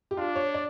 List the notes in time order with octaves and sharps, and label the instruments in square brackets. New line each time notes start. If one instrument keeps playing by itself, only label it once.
[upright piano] G4
[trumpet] D4 [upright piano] F4
[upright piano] C#5
D5